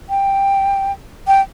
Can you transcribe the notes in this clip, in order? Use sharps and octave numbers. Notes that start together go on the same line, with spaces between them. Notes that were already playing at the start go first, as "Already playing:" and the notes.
G5
G5